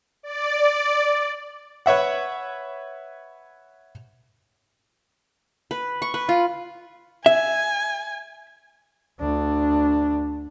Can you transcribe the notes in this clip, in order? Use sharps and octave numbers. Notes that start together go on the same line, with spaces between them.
D5
B4 C#5 E5 F#5
B4
C#6
B4
F4
E5 G#5
D2 D4